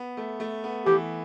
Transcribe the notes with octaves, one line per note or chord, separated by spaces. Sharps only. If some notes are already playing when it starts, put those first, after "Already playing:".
Already playing: B3
A3
A3
B3
E3 G4